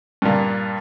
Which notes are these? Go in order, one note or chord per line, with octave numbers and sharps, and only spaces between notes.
G2 A#2